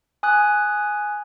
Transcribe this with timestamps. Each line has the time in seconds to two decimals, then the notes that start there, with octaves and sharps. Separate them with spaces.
0.23 G#5 D#6 F#6